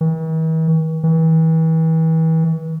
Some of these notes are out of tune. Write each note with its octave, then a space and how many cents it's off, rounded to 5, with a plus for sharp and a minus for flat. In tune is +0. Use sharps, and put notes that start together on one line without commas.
E3 -45
E3 -35